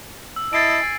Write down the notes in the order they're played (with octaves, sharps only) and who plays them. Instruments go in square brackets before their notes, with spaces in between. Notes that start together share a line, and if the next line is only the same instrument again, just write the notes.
[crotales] E6
[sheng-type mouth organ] E4 D#5 A5 [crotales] A6 C7 D7
[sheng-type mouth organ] G#5